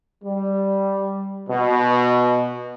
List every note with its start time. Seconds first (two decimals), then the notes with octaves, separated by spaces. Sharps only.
0.24 G3
1.49 B2